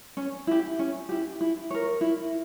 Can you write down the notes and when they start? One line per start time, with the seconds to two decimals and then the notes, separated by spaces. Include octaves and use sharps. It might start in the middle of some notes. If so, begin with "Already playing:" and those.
0.17 C#4
0.47 E4 G4
0.79 C#4
1.09 E4 G4
1.41 E4
1.71 A#4 C#5
2.01 E4